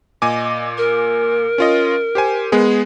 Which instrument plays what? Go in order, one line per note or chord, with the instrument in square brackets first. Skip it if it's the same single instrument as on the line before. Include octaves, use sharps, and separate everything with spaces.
[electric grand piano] A#2 G#5 D6 [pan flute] D#5
[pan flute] A#4
[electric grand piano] C#4 F4 D#5
G4 C5 G#5
G#3 B3 G#4